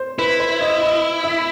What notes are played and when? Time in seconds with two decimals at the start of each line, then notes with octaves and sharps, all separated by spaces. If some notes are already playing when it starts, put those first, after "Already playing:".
Already playing: C5
0.19 E4 B4
0.40 C5
0.61 D#5
0.82 D#5
1.24 E5